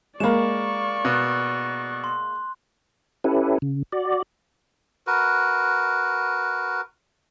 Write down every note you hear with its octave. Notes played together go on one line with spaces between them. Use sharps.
G#3 A#3 D5 B5 C#6 E7
B2 F#6
C6
C#4 E4 G4 A4 B4
C#3
F#4 D5
F#4 A#4 B4